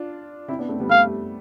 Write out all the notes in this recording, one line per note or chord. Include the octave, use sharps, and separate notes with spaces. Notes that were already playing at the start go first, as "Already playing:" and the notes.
Already playing: D4 F4
C4 E4
B3 D4
A3 C4
G3 B3
A3 F5
G3